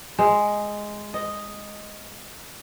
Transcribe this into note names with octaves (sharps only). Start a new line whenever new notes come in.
G#3
D#5